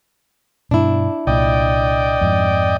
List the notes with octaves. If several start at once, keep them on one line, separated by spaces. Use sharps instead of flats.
G2 B2 D4 E4
C2 A#2 D5 D#5 G5
F2 G#2